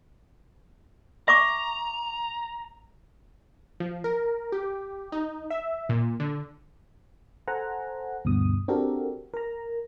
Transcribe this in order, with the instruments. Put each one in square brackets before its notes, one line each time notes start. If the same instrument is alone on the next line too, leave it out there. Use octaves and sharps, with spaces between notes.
[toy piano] E5 C#6 D6 [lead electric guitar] A#5
[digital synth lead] F3
A#4
G4
D#4
E5
A#2
D3
[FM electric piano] A4 C5 F#5 G#5 A#5
D2 G2 B2 D#6
C4 D4 F#4 G4 A4 A#4
A#4 A#5